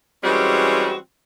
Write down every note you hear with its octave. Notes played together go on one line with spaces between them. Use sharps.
E3 G3 G#3 C4 C#4 F#4